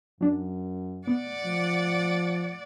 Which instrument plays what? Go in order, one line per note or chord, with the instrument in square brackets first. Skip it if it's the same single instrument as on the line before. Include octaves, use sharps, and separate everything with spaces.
[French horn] F#2 [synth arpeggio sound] F#3 D4
[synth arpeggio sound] B3 [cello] D5 F#5
[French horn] F3